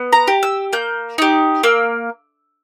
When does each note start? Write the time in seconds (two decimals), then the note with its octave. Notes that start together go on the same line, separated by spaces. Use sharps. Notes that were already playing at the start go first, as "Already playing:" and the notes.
Already playing: B3
0.13 A#5
0.28 G4
0.43 E6
0.73 A#3 G6
1.18 D#4 G4
1.63 A#3 E6